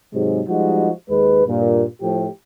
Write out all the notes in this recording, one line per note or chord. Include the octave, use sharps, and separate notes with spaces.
G#2 C3 F#3 G#3
F3 G3 G#3 D#4 F#4
D#2 G#3 B4
G2 A#2
A2 F3 A3 G4